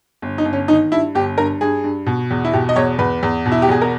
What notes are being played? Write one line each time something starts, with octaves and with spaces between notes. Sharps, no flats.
G1
D#4
G1
C#4
D#3 D#4
G2 E4
G1 G4
G2 A#4
G2 G#4
G2
B2
E2
E4
B2 G4
D#5
E2 C#5
E2 B4
E2
B2
E4
G4
E2 G#4
A#4